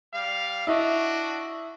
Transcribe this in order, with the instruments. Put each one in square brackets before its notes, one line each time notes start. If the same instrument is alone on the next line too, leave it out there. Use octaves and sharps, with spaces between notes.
[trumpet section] G3 F5
[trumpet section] D4 F#4 [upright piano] E4 D#5